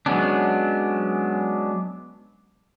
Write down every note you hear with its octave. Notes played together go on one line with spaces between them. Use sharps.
F#3 G#3 B3 C#4 D4